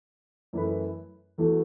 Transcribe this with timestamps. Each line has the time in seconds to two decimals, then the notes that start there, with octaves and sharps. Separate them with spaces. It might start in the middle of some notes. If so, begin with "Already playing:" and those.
0.53 F#2 E3 A3 E4 B4
1.38 E2 E3 A3 F#4 A4